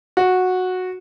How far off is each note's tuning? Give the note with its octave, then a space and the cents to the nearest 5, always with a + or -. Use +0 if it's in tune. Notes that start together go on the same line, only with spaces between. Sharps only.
F#4 -10